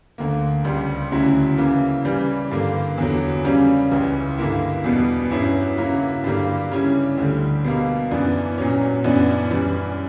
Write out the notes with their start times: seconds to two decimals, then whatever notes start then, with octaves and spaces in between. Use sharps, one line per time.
0.18 D2 D3 A#3
0.64 C#2 C#3 G3
1.11 D2 C#3 F#3 C#4 E4
1.58 C#3 E3 A#3
2.05 C#3 E3 G3
2.51 G2 D3 A#3
2.98 E2 D3 F#3
3.44 C#3 G3 A#3 C#4
3.90 C#2 C#3 E3
4.38 G2 D3 A#3 E4
4.84 E2 B2 G3 B3
5.31 G2 F#3 C#4 E4
5.78 C#3 F#3 A#3 E4
6.24 G2 D3 G3 A#3
6.71 C#3 G3 C#4 E4
7.17 D2 D3 G3
7.64 B2 G3 A#3
8.11 F#2 E3 B3 D4
8.58 A#2 F#3 C#4
9.04 F#2 E3 B3 D4
9.51 F#2 E3 G3